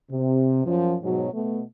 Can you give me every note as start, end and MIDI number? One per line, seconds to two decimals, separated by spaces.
0.11 0.64 48
0.65 0.95 42
0.65 0.95 53
1.02 1.28 44
1.02 1.28 47
1.02 1.28 54
1.32 1.60 47
1.32 1.60 57